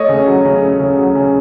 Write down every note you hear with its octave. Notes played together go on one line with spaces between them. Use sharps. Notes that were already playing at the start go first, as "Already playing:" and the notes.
Already playing: A3 C#5 D#5
C#3
F#3
C#3
A3
C#3
F#3
C#3